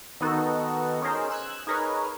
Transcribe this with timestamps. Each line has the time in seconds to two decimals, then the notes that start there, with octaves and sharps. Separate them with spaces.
0.21 D#3 B3 D#4 F#4 A4
1.02 C#4 D#4 G#4 A#4 C5
1.30 E6 F#6 G#6
1.67 D#4 G#4 A#4 B4 C#5